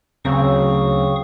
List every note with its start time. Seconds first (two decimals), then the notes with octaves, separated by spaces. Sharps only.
0.25 D2 C#3 F#3 C4 F5 C#6 D#6